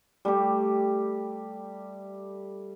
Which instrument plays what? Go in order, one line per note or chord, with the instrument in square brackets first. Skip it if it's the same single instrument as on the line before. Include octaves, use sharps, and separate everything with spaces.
[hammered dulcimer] G3 A3 G4